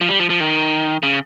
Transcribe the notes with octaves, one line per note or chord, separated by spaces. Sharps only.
F3
G3
F3
F3
D#3
C#3